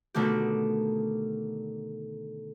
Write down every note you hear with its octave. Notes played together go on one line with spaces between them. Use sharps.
B2 D3 D#3 A3 G4